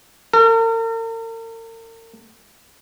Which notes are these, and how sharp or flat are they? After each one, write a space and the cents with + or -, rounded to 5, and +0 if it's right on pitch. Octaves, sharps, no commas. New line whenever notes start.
A#4 -45